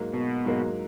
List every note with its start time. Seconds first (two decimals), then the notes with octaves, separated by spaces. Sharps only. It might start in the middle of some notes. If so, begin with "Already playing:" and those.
Already playing: G#2 F#3 A#3
0.14 B2
0.45 G#2 F#3 A#3